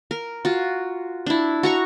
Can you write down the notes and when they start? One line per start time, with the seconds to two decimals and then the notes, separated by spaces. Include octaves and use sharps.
0.11 A#4
0.45 F4 F#4
1.26 D4 E4
1.63 F#4 A#5 C#6